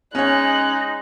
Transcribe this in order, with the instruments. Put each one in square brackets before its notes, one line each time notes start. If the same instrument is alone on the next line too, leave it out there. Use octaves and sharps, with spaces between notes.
[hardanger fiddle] G#3 [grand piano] C#4 C#5 [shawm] D#4 [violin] F#6